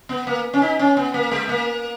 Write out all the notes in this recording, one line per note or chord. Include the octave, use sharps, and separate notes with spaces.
B3
A#3
C#4
D#4
C#4
B3
A#3
G#3
A#3